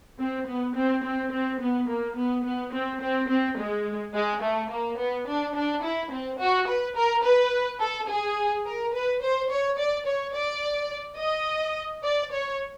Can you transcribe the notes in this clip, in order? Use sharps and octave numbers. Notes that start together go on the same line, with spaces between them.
C4
B3
C4
C4
C4
B3
A#3
B3
B3
C4
C4
C4
G#3
G#3
A3
A#3
B3
D4
D4
E4
C4
F#4
B4
A#4
B4
A4
G#4
A#4
B4
C5
C#5
D5
C#5
D5
D#5
D5
C#5